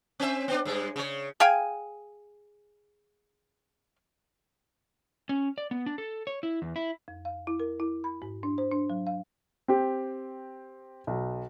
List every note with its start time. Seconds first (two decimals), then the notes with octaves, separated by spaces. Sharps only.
0.20 C4 C5 E5
0.48 B3 D4
0.65 G2 G#3
0.96 C#3 C#5
1.40 G#4 F5 G5 G#5
5.29 C#4
5.58 D5
5.71 B3
5.86 D4
5.98 A4
6.27 C#5
6.43 E4
6.62 E2
6.76 E4
7.08 F2
7.25 F5
7.47 E4
7.60 A#4
7.80 E4
8.04 B5
8.22 G#2
8.43 D4
8.58 C5
8.72 D4
8.90 F#3
9.07 F5
9.68 C4 G4
11.07 B1